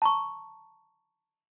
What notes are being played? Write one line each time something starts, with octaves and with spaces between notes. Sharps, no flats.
A5 A#5 C#6